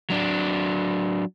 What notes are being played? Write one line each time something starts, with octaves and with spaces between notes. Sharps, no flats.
F#3 D4